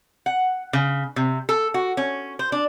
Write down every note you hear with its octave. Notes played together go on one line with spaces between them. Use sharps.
F#5
C#3
C3
A4
F#4
C#4
C5
D4